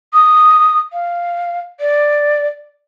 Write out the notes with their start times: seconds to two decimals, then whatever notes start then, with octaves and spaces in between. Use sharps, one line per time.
0.13 D#6
0.93 F5
1.80 D5